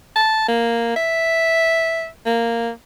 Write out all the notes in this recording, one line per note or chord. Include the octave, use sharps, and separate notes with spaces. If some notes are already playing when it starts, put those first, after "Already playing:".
A5
A#3
E5
A#3